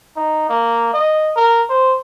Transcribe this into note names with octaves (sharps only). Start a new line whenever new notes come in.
D#4
A#3
D#5
A#4
C5